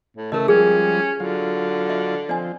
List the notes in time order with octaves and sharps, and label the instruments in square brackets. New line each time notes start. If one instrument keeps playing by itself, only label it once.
[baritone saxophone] A2
[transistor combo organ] C#3 E3 [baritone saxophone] A3 [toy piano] A#4 D#5
[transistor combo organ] F3 G3 G#3 [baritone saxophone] C#4 [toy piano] G#4
[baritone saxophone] D3 [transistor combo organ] F#3 F4
[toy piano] D#5 E5
[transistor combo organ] F3 C4 [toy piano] D5 D#5 G#5